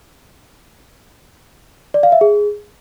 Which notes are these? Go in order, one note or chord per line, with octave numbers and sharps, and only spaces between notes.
D5
F5
E5
G#4